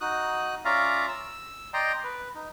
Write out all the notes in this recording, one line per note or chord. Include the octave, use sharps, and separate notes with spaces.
D#4 F#4 D#6 F#6
C#4 F4 D5 E5 F5 A#5
E6
D5 D#5 G5 A#5 C6
B4
D#4